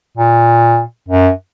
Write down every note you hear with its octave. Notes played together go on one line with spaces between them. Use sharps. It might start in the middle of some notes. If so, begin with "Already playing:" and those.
A#2
F#2